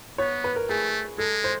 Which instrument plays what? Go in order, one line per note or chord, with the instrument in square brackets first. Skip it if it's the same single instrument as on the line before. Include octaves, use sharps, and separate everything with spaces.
[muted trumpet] B3 [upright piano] C#5
[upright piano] B4
A#4
[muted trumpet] A3 [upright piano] G#4
[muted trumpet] G#3 [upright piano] A4
[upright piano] C5